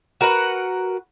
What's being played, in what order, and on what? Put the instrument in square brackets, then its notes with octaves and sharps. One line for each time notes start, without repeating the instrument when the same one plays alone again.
[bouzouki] F#4 A#4 B4 F#5